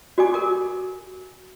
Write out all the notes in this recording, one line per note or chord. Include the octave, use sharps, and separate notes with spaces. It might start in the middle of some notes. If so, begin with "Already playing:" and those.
F#4 G4 D5 G#5 D6
A#4 D6